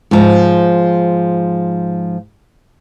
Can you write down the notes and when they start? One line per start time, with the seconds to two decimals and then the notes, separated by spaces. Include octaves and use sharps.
0.11 G#2 F3